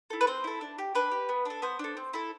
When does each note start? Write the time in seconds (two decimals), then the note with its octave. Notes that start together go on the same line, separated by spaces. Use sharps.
0.10 E4 A4
0.21 B4
0.27 C4 C5
0.44 E4 A4
0.61 D4
0.78 G4
0.95 D4 B4
1.12 G4
1.29 B3
1.45 D4 A4
1.62 B3 C5
1.79 D4 A4
1.97 C4
2.13 E4 A4